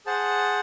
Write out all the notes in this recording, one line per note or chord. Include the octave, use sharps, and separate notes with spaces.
G#4 C5 F#5 A5